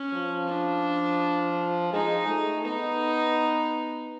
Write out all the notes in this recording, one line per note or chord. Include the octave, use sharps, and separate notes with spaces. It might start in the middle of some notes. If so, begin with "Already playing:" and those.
Already playing: C#4
F3
D4
G#3 D#4
A3
B3 D#4